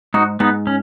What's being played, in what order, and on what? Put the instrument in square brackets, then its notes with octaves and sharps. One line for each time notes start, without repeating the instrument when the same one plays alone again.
[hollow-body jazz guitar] G#2 [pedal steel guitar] D#4 F#4
[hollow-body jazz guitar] G#2 [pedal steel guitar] B3 D#4
[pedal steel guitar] C#4